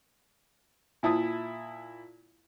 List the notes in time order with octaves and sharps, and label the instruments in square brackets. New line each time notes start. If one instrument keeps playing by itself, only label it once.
[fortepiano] A#2 E4 A5 D#6